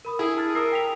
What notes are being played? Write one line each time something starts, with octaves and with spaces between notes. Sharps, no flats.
A#4 B5 D#6
E4 G#4
A5 F6 A6
A#4 D#6 E6 C7
G5 B6 F7